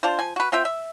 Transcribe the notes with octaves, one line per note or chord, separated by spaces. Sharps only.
D4 F4 C5
F3 G#5
F#4 B4
C4 F4 E5 G5
E5